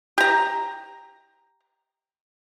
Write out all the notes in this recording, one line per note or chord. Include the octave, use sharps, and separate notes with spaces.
G4 A#5